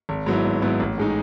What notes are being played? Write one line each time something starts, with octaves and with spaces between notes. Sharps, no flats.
G#1
G#2 F#3 B3 E4
G#1
G#2 F#3 B3 E4
A1
A2 G#3 D#4